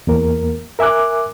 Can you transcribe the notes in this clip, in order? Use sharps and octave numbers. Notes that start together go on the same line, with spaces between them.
E2 A#3 A#4
A#4 E5 G#5 D6 F#6